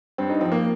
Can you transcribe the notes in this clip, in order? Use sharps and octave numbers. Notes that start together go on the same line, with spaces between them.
G2 C4
D#4
F3 C4
A#3